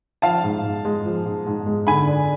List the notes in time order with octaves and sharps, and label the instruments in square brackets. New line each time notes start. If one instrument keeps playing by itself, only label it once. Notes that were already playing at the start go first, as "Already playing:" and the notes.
[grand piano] F3 F5 A5
G#2
G#2
G#3
F3
G#2
G#2
G#3
D3 G#5 B5
D4